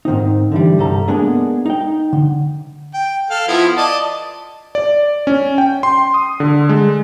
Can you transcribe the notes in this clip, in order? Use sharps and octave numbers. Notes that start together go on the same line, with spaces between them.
G#2 D#3 C4 D#4
D3 E3 G3
C2 G2 G3 A4 A#5
G#3 A#3 B3 D4 G#4
D#4 G5
D3
G5
A4 F5
F3 B3 E4
D5 D#5 A5
D5
C#4
G5
C6
D#6
D3
G#3